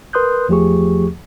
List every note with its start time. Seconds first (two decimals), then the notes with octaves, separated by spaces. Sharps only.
0.13 A#4 B4 C6 D#6 F#6 G6
0.48 E2 F3 A3 G4 G#4 C#6